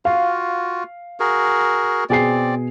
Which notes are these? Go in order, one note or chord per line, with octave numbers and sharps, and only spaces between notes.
F4 F#4 F5
F#4 G#4 A#4
B2 C4 G#4 D5 C7